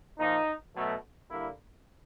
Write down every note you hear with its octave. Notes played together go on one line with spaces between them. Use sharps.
A#2 F3 A#3 D#4
B2 F#3 A3
D3 G3 A#3 E4